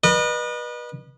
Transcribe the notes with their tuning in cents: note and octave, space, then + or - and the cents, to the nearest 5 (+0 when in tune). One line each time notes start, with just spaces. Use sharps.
B4 -30 D#5 -40